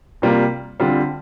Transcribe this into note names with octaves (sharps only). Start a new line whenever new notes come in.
C3 G3 A#3 F4
D3 G3 C4 F4